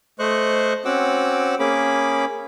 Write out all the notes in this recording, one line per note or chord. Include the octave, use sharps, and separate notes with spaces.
A3 C5 D#5 C#6 F#6
C4 C#4 F#4 F#5 D6 E6
A#3 C#4 G#4 B5 D6